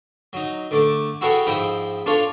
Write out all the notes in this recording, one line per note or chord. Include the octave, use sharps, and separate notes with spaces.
F#3 D#4
D3 A3 D6
E4 F#4 G#4 A4 C#5 G5
G#2 F3 E4 G5 B5 D#6
D4 F4 A4 C#5 F5